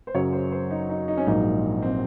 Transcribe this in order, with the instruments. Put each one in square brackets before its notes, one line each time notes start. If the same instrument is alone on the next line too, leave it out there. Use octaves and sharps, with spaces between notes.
[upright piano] C5
[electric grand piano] F#2 C#3 F#3 [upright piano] C#5
[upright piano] C5
C5
D#4
D#4
D#4
C#4
[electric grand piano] A#1 G#2 F#3 A#3 [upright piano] D#4
[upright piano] C4